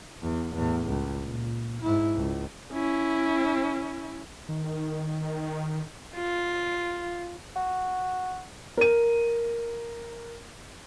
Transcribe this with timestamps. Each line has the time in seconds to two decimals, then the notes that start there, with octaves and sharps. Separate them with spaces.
0.23 E2
0.55 E2 A2
0.88 C#2
1.22 A#2
1.82 G#2 E4
2.16 C#2
2.73 C#4 E4
4.48 D#3
6.15 F4
7.56 F#4
8.77 A#4 D#7